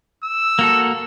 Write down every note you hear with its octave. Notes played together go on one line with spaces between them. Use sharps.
E6
A#3 F#4 A4